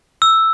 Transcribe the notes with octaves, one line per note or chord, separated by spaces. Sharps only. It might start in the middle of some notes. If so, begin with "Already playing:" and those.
E6